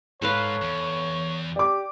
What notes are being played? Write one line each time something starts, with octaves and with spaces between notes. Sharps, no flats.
G#2 A4 B4 C#5 F5
E2
G4 D5 D6